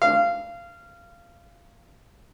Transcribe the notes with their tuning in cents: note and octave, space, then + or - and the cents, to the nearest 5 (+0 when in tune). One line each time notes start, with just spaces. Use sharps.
F5 -20